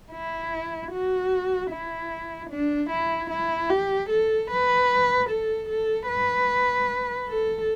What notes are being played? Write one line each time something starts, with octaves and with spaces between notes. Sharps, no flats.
E4
F#4
E4
D4
E4
E4
G4
A4
B4
A4
A4
B4
A4